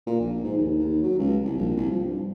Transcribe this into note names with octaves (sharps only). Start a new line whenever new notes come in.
A#2
A#1
G#2
D#2
D#2
F#3
C#2
C2
A#1
C2
F3
G2